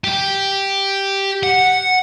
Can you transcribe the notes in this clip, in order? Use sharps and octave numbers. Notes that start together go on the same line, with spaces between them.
G4
F#5